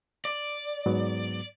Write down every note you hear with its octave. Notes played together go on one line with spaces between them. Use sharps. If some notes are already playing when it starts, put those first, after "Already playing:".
D5
G#2 F#3 B3